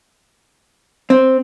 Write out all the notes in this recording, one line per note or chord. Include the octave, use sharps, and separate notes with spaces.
C4